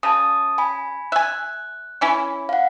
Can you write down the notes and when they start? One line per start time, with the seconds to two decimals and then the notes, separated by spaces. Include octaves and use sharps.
0.03 C#3 A5 D#6
0.58 G#5 B5
1.12 E5 G#5 F#6
2.01 E3 C#4 E4
2.49 F5 F#5